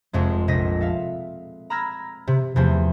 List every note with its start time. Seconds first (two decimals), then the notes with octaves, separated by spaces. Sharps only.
0.13 F1 F2 G#3
0.48 F1 A#1 D#5 A#6 B6
0.81 A4 E5 F5
1.70 A#5 B5 E6 F6 G#6 A#6
2.27 C3
2.56 E2 C3 E3 F3 A3 C4